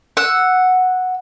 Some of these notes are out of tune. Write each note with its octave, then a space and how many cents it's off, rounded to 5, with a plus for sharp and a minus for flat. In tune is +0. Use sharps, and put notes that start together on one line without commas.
F#5 -5 E6 +0